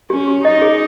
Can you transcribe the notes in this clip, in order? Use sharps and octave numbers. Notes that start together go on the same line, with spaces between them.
C#4 G4
G4
D#4 D#5
G#4